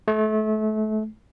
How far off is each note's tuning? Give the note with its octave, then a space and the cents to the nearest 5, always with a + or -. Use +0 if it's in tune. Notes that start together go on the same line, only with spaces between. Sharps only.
A3 -30